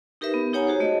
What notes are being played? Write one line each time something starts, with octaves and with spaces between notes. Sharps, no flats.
D#4 G4 A#4 B4 E5
B3
D#4 G4 C#5 F#5 G#5 A#5
F#4 G#4 C5
A3 D#5